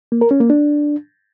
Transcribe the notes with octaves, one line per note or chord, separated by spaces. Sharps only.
A#3
A#4
C#4
A#3
D4